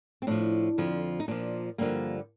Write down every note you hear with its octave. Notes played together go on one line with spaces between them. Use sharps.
C4
A2 F3 D4
F2 D3 F3
D#4
A#2 F3 D4
G2 D3 F3 A#3